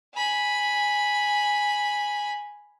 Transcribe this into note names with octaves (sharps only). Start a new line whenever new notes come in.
G#5 B5